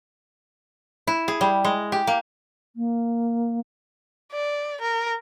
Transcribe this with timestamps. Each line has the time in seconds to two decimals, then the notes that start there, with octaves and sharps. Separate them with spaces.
1.07 E4
1.28 G#4
1.41 G3
1.64 G#3
1.92 G4
2.07 A#3
2.76 A#3
4.32 D5
4.81 A#4